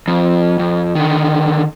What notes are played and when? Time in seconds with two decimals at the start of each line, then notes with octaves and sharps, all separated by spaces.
0.08 F2
0.59 F2
0.95 D3 D#3